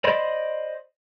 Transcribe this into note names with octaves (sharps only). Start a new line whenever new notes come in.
C5 D5 D#5 B5 C6